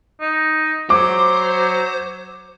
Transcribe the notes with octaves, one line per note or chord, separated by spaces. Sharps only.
D#4
F#3 C5 D6